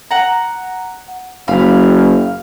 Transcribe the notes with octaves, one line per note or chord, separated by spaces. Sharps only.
F#5 A#5
F#1 F5 B5